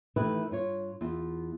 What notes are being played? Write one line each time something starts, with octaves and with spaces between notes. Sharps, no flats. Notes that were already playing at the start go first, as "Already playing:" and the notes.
D#3 E3 A3 E4 G4 B4
G2 F4 C#5
E2 F4